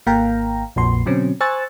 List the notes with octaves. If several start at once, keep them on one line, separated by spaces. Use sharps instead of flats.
G#1 A#3 F5 G5 A#5
A#1 F2 A#2 C6
B2 D3 F#3 C4 C#4
C5 G#5 C#6 E6 F#6 A6